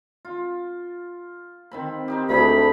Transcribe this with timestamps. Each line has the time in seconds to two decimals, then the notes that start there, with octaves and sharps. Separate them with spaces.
0.25 F4
1.71 D#3 C4 B5
2.08 C4 D#4 G4
2.29 D2 A3 G#4 B5